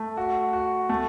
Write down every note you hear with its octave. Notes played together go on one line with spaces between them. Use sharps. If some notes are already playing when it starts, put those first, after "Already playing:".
Already playing: A3
F#4
F#4
A3